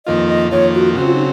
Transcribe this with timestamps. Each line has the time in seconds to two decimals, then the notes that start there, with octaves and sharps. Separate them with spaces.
0.06 F2 D#3 A#3 F4 D#5
0.29 D#5
0.51 F2 D#3 A#3 F4 C#5
0.74 F#4
0.96 C#3 F#3 C4 F#4
1.05 F4
1.14 D#4